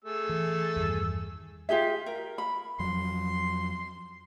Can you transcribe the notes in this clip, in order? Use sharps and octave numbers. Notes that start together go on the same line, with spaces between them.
A3 G#4 E6
E3
E2 G2 D#3
F4 G4 G#4 E5
A#4
B5
F2 F3 F#3 C6